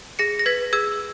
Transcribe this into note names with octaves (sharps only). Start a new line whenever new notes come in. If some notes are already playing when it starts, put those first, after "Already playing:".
G#4 A#6 C#7
A#6
B4 G#6 B6
G#4 E6 G#6